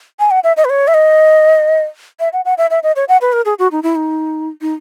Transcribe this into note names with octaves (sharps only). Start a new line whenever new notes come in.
G#5
F#5
E5
D#5
B4
C#5
E5
D#5
E5
F#5
F#5
E5
E5
D#5
C#5
F#5
B4
A#4
G#4
F#4
D#4
E4
D#4
D#4